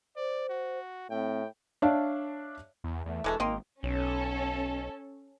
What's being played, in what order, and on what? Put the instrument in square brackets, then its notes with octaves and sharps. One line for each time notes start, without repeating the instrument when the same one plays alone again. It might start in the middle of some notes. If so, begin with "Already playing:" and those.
[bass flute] C5 [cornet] D5
[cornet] F#4
[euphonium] A2 [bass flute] C4 [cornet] G5
[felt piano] D4 C#5 D5 E5 F5
[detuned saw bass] E2
[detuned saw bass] E2 [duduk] A3
[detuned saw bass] E1 [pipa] E3 G#3 A3 [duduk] A4
[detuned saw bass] G#1 [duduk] A#3 [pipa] D#5 G5 C6
[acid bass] B1 [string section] C#4 A4